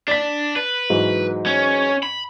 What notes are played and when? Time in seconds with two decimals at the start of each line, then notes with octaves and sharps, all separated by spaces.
0.08 D4 D5 B6
0.56 B4
0.90 G#2 E3 F#3
1.46 C#4
2.03 B5